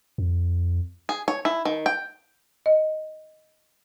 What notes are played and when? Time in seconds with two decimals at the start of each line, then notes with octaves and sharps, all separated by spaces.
0.18 F2
1.09 G#4
1.28 C#5
1.45 E4
1.65 D#3
1.86 G5
2.66 D#5